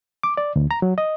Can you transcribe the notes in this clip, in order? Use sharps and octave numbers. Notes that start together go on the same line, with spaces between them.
D6
D5
D2
A#5
F#3
D#5